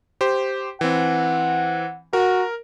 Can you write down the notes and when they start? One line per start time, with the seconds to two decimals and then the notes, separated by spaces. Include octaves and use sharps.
0.21 G4 C5
0.81 E3 C4 F#5
2.13 F#4 A#4